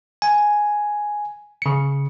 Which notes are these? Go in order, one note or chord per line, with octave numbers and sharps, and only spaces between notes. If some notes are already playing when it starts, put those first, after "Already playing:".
G#5
C#3 C#7